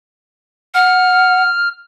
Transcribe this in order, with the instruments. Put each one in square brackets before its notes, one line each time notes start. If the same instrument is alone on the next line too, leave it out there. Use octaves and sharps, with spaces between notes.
[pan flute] F#5 [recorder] F6